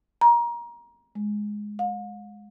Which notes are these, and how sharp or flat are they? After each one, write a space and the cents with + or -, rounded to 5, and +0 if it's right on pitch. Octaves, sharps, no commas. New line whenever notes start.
A#5 +25
G#3 +5
F5 +45